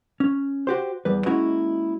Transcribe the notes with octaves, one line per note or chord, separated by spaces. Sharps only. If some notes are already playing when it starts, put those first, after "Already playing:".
C#4
F#4 G4 C5
E2 G3 B4
G#3 A#3 C#4 D#4 E4 F#4